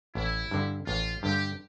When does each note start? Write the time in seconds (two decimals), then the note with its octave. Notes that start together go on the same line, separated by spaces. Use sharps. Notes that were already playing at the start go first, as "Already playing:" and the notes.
0.15 A1 E4
0.51 G2 D3
0.87 A1 F4
1.23 G2 D3 G4